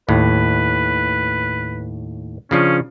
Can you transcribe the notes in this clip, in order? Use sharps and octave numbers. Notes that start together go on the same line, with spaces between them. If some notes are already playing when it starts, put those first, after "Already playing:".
D#2 A2 B4
C#3 F3 C#4 D4